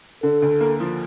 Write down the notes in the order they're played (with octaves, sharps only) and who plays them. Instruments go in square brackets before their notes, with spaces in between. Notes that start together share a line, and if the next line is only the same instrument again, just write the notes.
[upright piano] D3 [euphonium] A4
[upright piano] D2
A#3
F3